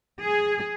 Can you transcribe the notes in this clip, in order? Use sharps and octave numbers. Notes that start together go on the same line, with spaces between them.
G#4